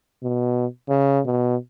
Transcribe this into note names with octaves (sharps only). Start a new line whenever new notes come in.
B2
C#3
B2